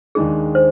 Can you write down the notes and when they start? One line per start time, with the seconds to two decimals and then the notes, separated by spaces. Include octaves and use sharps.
0.15 D#2 D#3 G#3 D4 G#4
0.55 C5